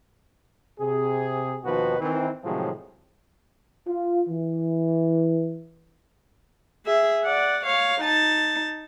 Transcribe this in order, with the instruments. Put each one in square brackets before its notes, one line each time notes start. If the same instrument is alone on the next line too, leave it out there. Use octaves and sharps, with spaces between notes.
[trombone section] C3 G#4
D#2 B2 D#3 F3 F#4 B4
D#3 E3 C4
A2 C3 D#3 F3 F#3 G#3
F4
E3
[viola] G#4 E5
D5 F#5
C#5 F5
D#4 A5